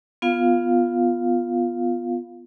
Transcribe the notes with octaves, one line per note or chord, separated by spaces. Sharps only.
B3 F4 F5